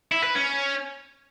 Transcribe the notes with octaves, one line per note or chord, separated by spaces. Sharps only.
E4
B4
C#4